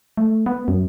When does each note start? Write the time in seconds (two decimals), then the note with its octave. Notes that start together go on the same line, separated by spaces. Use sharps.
0.17 A3
0.46 B3
0.68 F#2